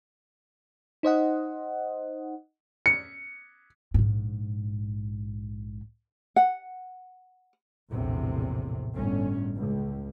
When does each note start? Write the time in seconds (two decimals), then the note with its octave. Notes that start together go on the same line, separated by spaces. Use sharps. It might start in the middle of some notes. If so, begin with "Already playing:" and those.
1.03 D#4 C5 D#5 F#5
2.86 C#7
3.94 A#1 G#2
6.36 F#5
7.91 A#1 E2 A2 C3
8.93 G1 A2 C#4
9.58 C#2